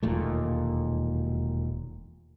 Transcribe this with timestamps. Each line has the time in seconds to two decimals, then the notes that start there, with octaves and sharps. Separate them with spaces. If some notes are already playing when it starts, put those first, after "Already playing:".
0.03 E1 D#2 A#2 A3